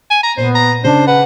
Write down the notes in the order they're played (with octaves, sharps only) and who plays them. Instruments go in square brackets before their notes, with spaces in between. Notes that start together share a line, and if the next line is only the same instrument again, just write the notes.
[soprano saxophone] G#5
A#5
[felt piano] A#2 [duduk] B3 [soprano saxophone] C5
[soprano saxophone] A#5
[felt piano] C#3 [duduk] D4 [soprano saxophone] C5
[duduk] B4 [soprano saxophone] F#5